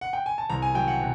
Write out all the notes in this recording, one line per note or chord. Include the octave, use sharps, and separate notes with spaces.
F#5
G5
G#5
A5
C2 A#5
G#5
F#3 G5
F#5
B2